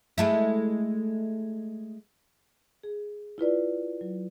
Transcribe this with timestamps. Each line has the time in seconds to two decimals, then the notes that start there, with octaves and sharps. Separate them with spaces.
0.18 G#3 A3 E4
2.83 G#4
3.38 E4 F4 B4 D5
4.01 F#3